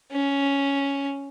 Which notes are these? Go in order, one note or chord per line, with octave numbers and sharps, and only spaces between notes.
C#4